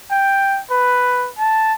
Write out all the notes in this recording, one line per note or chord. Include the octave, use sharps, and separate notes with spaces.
G5
B4
A5